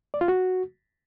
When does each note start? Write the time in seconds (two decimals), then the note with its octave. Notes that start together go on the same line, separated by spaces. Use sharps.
0.14 D5
0.21 F4
0.28 F#4